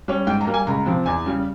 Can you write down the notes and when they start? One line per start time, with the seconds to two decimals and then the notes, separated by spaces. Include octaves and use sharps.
0.08 G3 C#4
0.27 G#2 G5
0.41 A#5
0.47 G3 A#3
0.54 G#5
0.67 C#2 A#5
0.86 C3 F3 C4
1.06 E2 G#5
1.26 C#3 G3